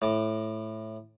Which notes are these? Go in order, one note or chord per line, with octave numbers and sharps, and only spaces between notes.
A2 D6